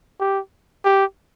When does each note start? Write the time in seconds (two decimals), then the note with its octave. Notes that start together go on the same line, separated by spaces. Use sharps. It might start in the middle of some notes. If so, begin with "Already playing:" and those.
0.20 G4
0.85 G4